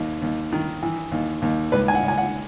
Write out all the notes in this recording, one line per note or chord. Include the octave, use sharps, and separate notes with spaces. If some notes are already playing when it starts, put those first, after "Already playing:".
Already playing: G#1 D#2
D#2
D#3
E3
D#2
D#2
C#2 B4
G#5
F#5
C#2
G#5
F#5